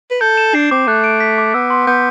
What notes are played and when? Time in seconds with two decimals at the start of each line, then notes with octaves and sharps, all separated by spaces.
0.11 B4
0.21 A4 G6
0.37 E7
0.55 D4 C7
0.71 C4 D6
0.87 A3 F#6
1.04 D7
1.20 B6
1.38 D6
1.54 B3 E6
1.70 C6
1.87 B3 G6